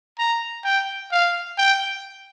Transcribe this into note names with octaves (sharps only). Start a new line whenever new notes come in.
A#5
G5
F5
G5